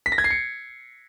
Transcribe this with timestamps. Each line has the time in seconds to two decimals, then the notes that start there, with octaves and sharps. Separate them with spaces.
0.06 B6
0.12 A#6
0.18 G#6
0.24 C7
0.30 C#7